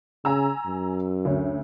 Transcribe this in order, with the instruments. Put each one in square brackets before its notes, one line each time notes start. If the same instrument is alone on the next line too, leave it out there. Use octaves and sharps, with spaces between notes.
[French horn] C#3 [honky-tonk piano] G#5 A#5 E6
[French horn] F#2
[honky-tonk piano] D2 C#4